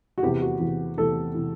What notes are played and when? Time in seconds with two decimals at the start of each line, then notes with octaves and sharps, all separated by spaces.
0.18 F#4
0.23 E2 C3 E3 G4
0.42 F#4
0.60 E2 C3 E3
0.97 E2 C3 E3 A4
1.34 C3 E3